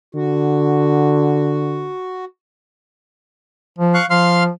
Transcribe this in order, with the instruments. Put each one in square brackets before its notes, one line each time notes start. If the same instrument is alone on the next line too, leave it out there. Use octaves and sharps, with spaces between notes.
[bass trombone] D3 [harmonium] F#4
[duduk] F3
[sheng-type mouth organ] F5 C#6 F#6
[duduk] F3 [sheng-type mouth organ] F5 C6 F6